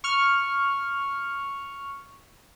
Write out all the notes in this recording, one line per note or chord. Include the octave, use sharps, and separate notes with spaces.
C#6 F6